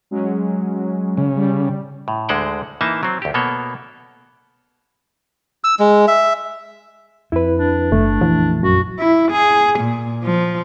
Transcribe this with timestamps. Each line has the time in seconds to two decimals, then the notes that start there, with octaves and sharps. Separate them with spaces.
0.11 F#3 G#3 C#4
1.17 C#3
1.36 G3
2.08 A2
2.29 D2 D3 G#3 C5 F#5 G5
2.81 E3 A#3 D#4 E5 A5
3.03 F#3 C4
3.22 D2 G4
3.34 B2 A#3 B3 A4 C#5
5.64 E6
5.79 G#3
6.08 E5
7.32 F2 C4 E4 B4
7.56 D4
7.92 F#1 A3
8.21 A#1 F2 E3
8.63 F#2 F#4
8.99 E4
9.32 G#4
9.79 A#2
10.24 F3